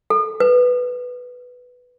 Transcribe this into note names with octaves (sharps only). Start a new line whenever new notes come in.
A4
B4